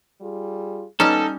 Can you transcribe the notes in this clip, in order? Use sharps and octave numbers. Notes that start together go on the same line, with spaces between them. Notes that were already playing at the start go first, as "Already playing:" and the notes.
G3 F4 G#4
D#2 G3 B3 C#4 D#4 A4